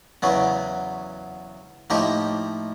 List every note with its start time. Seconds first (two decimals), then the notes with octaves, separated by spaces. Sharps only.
0.22 E2 C#3 F#3 B3
1.90 A2 F3 A#3 D#4 G4